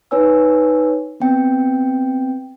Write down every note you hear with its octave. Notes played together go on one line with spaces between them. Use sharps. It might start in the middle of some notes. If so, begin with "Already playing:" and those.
D#4 B4 C#5 G#5 E6
B3 C4 G5